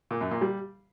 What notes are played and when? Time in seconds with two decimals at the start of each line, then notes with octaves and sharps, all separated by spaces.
0.11 A#2
0.21 F#2
0.31 A#2
0.41 G3